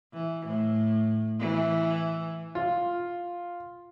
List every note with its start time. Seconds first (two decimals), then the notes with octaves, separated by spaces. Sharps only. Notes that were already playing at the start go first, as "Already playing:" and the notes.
0.14 E3
0.46 A2
1.39 E3
2.55 F4